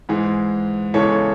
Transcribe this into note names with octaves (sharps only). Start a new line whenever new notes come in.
G#2 E3 G#3
E2 C#3 E3 G#3 A4 C#5